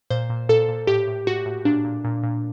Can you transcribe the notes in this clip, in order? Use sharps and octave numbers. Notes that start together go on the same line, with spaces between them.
A#2 C5
A#2
A#2 A4
A#2
A2 G4
A2
A2 F#4
A2
A#2 D4
A#2
A#2
A#2